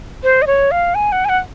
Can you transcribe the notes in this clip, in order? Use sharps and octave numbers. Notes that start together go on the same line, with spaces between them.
C5
D#5
C#5
F5
G#5
F#5
G#5
F#5